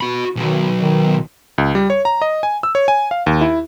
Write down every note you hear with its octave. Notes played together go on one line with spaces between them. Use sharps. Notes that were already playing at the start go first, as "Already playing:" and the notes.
F#4 B5
B1 D#3 F#3
D#3
C#2
G3
C#5
A#5
D#5
G#5
E6
C#5
G#5
F5
D#2
E4